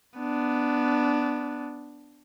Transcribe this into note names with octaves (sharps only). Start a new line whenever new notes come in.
B3 D4